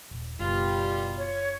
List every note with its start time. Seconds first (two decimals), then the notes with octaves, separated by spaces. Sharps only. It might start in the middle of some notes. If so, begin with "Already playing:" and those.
0.11 D#1
0.40 F#1 B2 G3 F4
1.18 C#5